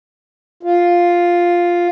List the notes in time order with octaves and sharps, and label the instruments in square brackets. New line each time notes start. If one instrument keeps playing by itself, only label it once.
[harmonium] F4